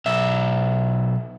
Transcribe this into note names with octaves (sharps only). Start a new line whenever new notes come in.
B1 E5